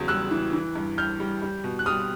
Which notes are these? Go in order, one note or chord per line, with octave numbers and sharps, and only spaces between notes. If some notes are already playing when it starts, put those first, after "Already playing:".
Already playing: E2 C#3 F#3
G3 E6 F#6
E3
E3
G2
G2 F6 G6
G3
G3
B2
F#6
G3 D#6 F6